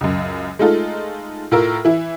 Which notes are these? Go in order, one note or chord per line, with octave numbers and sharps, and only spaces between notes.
C#2 F#2
G#3 A3 D#4 F4 A4
A2 F4 A#4 E6
E3 E4